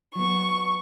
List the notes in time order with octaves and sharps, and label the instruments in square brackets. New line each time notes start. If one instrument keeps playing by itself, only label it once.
[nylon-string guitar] F#3 B3 [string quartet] C#6